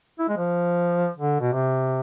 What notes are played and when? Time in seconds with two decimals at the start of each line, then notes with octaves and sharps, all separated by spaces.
0.19 E4
0.29 G#3
0.38 F3
1.17 D3
1.41 B2
1.53 C3